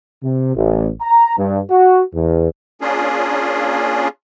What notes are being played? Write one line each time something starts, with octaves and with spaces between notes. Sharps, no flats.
C3
A1
A#5
G2
F#4
E2
A#3 C#4 D4 F4 G#4